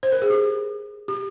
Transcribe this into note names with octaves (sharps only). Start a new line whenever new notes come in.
C5
A#4
G#4
G4
G4